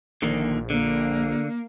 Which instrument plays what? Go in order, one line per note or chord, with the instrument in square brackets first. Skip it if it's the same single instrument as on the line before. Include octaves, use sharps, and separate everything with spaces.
[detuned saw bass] A#1 [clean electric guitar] D3 D#3 A#3
[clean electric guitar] D3 [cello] A#3